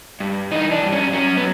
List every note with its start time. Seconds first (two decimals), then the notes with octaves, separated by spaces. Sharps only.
0.20 G2
0.51 E3 D#4
0.71 D4
0.82 G2
0.92 C#4
1.13 F#3 C#4
1.37 B3